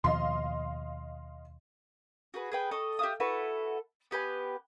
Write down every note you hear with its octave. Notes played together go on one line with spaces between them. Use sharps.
D#2 B2 F3 D#5 F5 C6
F#4 G#4 B4
G#4 B4 G5
A4 D#5 C#6
G4 E5 F5 D#6
E4 F#4 A4 B4
B3 G4 B4 G#5